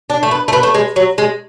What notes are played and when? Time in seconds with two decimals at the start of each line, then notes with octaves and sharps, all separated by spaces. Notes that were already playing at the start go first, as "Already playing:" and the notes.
0.10 D4
0.23 A3
0.31 B3
0.48 A3
0.53 B3
0.63 A3
0.74 G#3
0.96 F#3
1.18 G#3